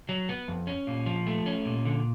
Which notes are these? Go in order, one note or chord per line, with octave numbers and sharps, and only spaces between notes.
F#3
B3
F2
C#4
A#2
F3
A3
C#4
A#2
D3